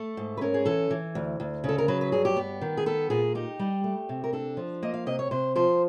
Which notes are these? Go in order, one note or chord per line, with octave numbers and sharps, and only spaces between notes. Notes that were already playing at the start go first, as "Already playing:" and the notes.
Already playing: A3 A4
G#2
B4
C#4 A#4
G#4
E3 A4
E3
D2
D2
C#3 A4
A#4
F#3 B4
B4
G2 G#4
G4
B3
D#3
G#4
B3 A4
A#2 G#4
D#4 G4
G3
A3
C3
A#4
D4 A4
F3
A#3 D#5
F5
C3 D#5
C#5
C3 C5
F3 C5